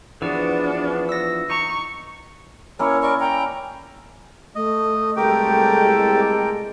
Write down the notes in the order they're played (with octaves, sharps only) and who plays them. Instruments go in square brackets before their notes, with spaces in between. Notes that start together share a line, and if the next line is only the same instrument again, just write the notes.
[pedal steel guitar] E3 F3 F#4 [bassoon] B3 [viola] D4 [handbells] G#4 B4
[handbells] E6 A#6
[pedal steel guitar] D#4 A#5 [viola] C#6
[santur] A#3 C#4 E4 [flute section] C#5
[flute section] A#4 D5 C#6
G5 A#5
[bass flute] A3 [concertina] D#5
[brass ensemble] C2 G#3 A4 [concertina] G4 [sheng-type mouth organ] A#4 G5